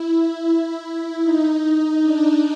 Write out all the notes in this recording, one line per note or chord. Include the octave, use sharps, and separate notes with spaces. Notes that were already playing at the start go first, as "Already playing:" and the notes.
Already playing: E4
E4
D#4
D4